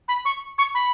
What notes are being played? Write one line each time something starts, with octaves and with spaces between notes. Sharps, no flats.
B5
C#6
C#6
B5